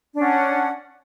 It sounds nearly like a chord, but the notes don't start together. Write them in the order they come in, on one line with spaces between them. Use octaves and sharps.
D4 C#4 F#5